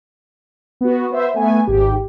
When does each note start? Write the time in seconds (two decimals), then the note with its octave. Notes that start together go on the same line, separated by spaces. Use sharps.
0.81 B3 F#4
1.10 B3 C5 E5
1.34 A3 B3 G#5
1.67 G#1 G#2 G4